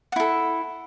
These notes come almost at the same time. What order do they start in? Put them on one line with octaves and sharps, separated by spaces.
F#5 E4 A4